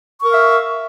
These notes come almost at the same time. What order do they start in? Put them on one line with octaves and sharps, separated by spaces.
C#6 A#4 F5 E5